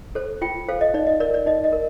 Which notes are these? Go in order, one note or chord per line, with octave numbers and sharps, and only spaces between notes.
A4 C5
F4 G5
A4 C5 F5
D#5
D#4 D5
D#5
A#4 D5
D5
D#4 D#5
D#5
A#4